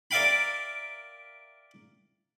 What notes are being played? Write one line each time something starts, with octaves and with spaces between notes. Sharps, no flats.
A#4 D5 E5 F5 G5 B5